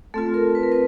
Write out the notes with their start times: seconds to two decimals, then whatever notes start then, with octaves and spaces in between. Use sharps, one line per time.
0.14 A3 C4 F4 A4
0.34 A#4
0.55 B4
0.63 A#4
0.72 B4